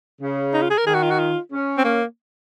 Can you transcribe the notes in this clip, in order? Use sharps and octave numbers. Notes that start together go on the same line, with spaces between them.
C#3
D#4
F4
G#4
A#4
D#3 G#4
F#4
F4
F#4
F4
C#4
C4
A#3